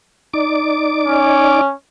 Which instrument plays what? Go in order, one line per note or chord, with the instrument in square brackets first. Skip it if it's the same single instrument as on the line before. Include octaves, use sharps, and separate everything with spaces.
[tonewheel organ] D#4 D5 D6
[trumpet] C#4